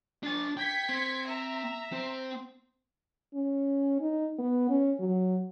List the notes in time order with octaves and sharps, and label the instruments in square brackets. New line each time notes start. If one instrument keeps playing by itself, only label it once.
[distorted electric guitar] D4 G#5 [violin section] A6
[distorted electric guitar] G5 [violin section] G#6 B6 C#7
[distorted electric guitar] C4
[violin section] E5 A#5
[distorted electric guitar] C4
[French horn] C#4
D#4
B3
C#4
F#3